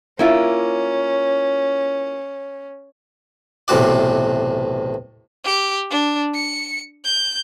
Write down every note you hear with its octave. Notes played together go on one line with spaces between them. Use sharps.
A#3 C#4 E4 F4
B1 E2 A2 C3 F#4 D5
G4
D4
C#7
G6